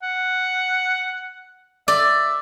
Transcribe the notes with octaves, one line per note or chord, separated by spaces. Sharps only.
F#5
D5 E5